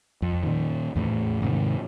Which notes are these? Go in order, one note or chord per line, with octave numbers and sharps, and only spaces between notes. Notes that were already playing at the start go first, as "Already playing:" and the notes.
F2
A#2 D#3
E2 A2
G#2 C3 D#3